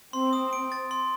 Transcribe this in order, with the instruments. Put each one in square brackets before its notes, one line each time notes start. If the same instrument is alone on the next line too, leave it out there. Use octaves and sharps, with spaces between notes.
[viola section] C4 [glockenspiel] C6
[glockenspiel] D#6
D7
A6
C6